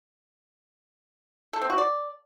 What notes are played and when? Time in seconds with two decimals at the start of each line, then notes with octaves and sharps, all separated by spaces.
1.53 A4
1.61 C4
1.70 F#4
1.78 D5